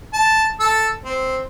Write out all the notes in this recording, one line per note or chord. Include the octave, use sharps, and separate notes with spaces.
A5
A4 E6
C4